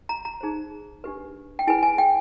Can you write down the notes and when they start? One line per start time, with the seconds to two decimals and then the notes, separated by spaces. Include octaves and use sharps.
0.09 A#5
0.25 A#5
0.41 D#4 G#4 C5
1.04 D4 G4 B4
1.59 G5
1.67 E4 G#4 B4 G#5
1.83 G#5
1.98 G5